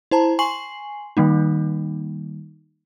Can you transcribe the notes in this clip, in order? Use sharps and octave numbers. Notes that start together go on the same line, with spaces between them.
E4 C5 A5 A#5
G#5 C6 C#6 C7 F#7
D#3 G3 A#3 D#4